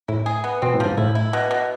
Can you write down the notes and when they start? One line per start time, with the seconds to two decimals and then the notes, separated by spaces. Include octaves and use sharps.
0.08 A2 E4
0.26 G#4
0.44 B3
0.62 B2 C4
0.74 A2
0.80 F3
0.86 G#2
0.97 A2 E4
1.15 E4
1.33 B2
1.51 B2